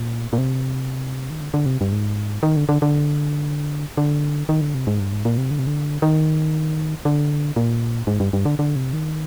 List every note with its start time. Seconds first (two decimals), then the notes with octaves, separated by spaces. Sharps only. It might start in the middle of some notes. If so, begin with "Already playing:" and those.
Already playing: A#2
0.33 A#2
0.38 C3
1.30 D#3
1.41 D3
1.54 D3
1.66 C3
1.81 G2
1.92 G#2
2.43 D#3
2.56 D3
2.69 D3
2.82 D3
3.97 D3
4.49 D#3
4.61 D3
4.74 C3
4.87 G#2
5.00 G2
5.12 G#2
5.25 A#2
5.38 C3
5.51 D3
5.59 C3
5.67 D3
6.02 D#3
7.05 D3
7.56 A#2
8.07 G#2
8.20 G2
8.33 G2
8.45 D3
8.59 D3
8.76 C3
8.93 D#3